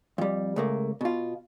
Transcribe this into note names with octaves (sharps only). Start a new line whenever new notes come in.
F2 G3
C#2 A3 A#3
B2 F4